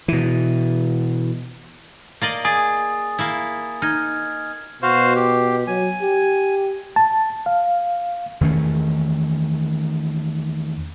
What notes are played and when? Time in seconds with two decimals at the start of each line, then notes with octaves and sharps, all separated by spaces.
0.08 B2 E3
2.22 A#3 D5 D#5
2.45 G#4 G#5 D#6 A6
3.19 A#3 E4
3.82 D#4 F6 G#6
4.83 B2 F#4 C5 F5
5.15 G4
5.67 F#3 G#5
6.02 G4
6.96 A5
7.46 F5
8.41 E2 D#3 A3 C#4